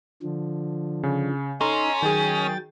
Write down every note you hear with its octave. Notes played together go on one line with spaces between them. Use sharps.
D3 F3
C#3
C#4 D#4 A4 A#5 C6
D#3 F#3 G#4 G5 A6